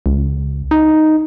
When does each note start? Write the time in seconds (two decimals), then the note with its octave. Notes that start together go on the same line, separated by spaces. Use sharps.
0.06 C#2
0.71 D#4